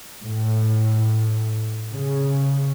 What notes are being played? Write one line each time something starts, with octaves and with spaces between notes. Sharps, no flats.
A2
C#3